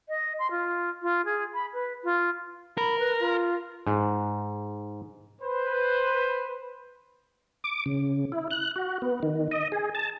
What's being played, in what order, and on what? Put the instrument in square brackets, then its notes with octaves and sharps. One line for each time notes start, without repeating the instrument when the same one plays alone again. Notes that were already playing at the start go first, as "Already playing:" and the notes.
[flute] D#5
C6
F4
F4
G#4
B5
B4
F4
[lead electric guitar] A#4 [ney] B5
[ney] B4
F4
[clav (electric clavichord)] G#2
[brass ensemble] B4 C5
[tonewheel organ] D6
C#3
E4
F#6
F#4
B3
D#3
D#5
G#4
A5